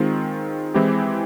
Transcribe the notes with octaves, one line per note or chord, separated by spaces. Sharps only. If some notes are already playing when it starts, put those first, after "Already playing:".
Already playing: D#3 G#3 C4 F4
E3 G#3 C4 E4 G4